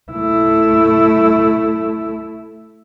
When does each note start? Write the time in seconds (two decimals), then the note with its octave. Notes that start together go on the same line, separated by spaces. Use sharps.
0.12 A3 E4